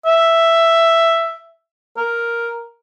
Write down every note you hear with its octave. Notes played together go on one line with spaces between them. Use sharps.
E5
A#4